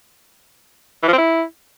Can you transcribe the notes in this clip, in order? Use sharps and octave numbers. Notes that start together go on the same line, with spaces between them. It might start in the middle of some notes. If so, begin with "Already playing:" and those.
E3
F3
C4
E4